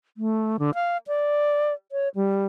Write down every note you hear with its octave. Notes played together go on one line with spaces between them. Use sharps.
A3
D3
F5
D5
C#5
G3